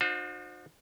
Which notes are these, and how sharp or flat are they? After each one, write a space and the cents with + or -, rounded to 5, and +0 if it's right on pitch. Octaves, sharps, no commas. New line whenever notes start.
D#4 -45 F#4 -45 C5 +0